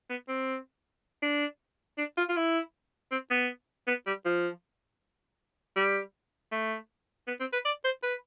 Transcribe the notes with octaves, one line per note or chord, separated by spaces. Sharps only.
B3
C4
D4
D4
F4
F4
E4
C4
B3
B3
G3
F3
G3
A3
B3
C4
B4
D5
C5
B4